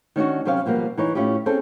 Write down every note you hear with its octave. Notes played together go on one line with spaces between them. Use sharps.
D#3 C#4 D4 F#4
C3 F#3 C4 C#4 F5
B2 F3 G3 A#3
E3 D#4 C#5
A2 C#4 E4 F4 G4
C4 C#4 G#4 A4